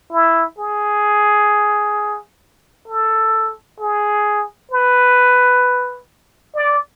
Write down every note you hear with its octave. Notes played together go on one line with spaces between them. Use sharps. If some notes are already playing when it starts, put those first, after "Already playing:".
E4
G#4
A4
G#4
B4
D5